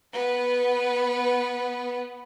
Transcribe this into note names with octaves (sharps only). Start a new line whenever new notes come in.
B3 B4